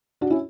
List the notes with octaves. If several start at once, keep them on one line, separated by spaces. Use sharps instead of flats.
D4 F#4
C#4 E4